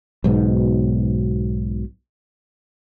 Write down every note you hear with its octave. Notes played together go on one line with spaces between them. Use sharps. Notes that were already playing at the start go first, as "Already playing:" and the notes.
B1 G#2 B2